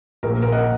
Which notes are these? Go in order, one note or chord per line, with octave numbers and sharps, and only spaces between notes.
A#1 A#2 A#4
A#4
D#5 F#5